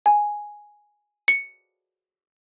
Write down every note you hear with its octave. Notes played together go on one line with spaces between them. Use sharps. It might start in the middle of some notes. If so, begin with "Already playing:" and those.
G#5
C#7